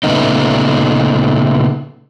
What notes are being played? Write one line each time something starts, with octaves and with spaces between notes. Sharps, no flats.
A#2 C#3 A3 B3 D#4